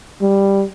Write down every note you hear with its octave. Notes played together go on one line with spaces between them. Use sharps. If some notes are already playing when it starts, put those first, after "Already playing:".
G3